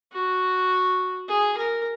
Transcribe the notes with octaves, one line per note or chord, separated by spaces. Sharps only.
F#4
G#4
A#4